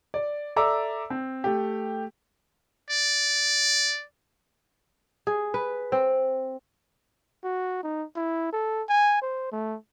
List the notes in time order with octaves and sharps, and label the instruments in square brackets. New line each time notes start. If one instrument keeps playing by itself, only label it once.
[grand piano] D5
A4 D5 E5 A#5 D6 E6
C4
A3 G4
[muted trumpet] D5
[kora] G#4
B4
C4
[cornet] F#4
D#4
E4
A4
G#5
C5
A3